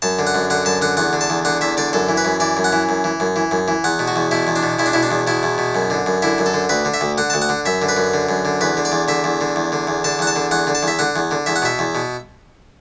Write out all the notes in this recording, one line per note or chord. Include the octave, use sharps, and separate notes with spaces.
F#2 A5
D3
F#5
F#2
D3 F#5
F#2 A5
D3 F#5
E2 F#5
D3
A5
E2
D3 F#5
E2 E5
D3 D5
F#2 A4
E3
B4
F#2
E3 D5
F#2
F#5
E3
F#2
E3
F#2
E3
F#2
E3
E2 F#5
B2
F#4
E2
B2 E4
E2
D4
B2
E2 E4
D4
B2 E4
D4
E2
B2 E4
E2
B2
F#2
D3
F#2
D3 E4
F#2
A4
D3
D2 B4
D3
E5
D2
D3 F#5
D2 A5
F#5
D3
F#2 E5
D3
B4
F#2
D3
F#2
D3
E2 B4
D3
D5
E2
D3 E5
E2
D3
E2
D3
E2
D3 A5
E2 F#5
A5
D3
E2 F#5
D3
A5
E2 E5
D3 F#5
E2
D3
E2 E5
F#5
B2 E5
E2
B2